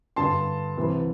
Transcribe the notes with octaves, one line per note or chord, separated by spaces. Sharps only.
G2 D3 A5 C6
C2 C3 E3